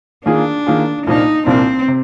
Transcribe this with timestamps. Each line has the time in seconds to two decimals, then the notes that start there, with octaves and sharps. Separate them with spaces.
0.26 D#3 A#3 D4 F4 G#4
0.66 D#3 A#3 F4 G#4
1.06 C2 A#2 F3 A#3 D4 D#4
1.46 C2 A#2 F3 A#3 C4 D4
1.88 C3